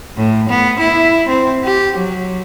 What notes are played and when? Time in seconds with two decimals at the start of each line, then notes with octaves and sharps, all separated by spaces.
0.17 A2
0.49 B3
0.79 E4
1.28 C4
1.64 G4
1.96 F#3